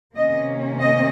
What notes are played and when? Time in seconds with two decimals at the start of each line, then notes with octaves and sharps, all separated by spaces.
0.15 C3 D#3 A#3 C#4 D#5
0.80 D#5